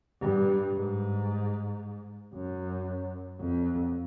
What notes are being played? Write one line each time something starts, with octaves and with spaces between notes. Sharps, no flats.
G2
G#2
F#2
F2